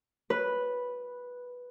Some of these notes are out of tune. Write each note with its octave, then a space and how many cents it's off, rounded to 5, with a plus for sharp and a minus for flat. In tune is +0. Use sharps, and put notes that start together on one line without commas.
B4 -5